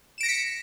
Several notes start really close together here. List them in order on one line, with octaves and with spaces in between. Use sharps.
E7 D7 A#6 C#7 B6